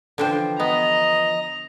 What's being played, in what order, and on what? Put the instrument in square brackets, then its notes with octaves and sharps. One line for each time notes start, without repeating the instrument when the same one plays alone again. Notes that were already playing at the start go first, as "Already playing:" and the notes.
[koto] D3 D4 C5 [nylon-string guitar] E3 F3 G5
[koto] B3 [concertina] D#5 [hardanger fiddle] A#5